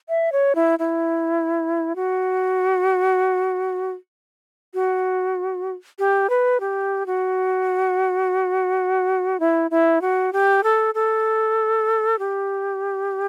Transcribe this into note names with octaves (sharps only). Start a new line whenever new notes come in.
E5
C#5
E4
E4
F#4
F#4
G4
B4
G4
F#4
E4
E4
F#4
G4
A4
A4
G4